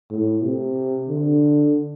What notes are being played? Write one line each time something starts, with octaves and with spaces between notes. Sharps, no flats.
A2
C3
D3